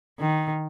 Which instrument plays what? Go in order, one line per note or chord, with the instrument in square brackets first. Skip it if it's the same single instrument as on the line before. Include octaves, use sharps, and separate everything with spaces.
[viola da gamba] D#3